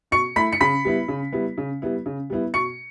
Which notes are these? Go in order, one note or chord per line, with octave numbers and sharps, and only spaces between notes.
B2 C#6 C#7
A3 E4 B5 B6
C#7
C#3 B5 B6
G3 B3 E4
C#3
G3 B3 E4
C#3
G3 B3 E4
C#3
G3 B3 E4
B2 C#6 C#7